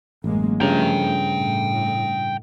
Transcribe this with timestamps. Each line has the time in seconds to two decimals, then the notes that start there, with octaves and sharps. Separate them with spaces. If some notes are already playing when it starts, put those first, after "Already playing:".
0.24 A1 F#2 G#3 A#3
0.61 G2 C#3 F3 A3 G5 A#5
1.39 A2